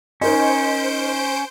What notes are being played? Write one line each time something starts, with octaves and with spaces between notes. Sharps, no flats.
C#4 D#4 A#4 C5 D#5 G6 D7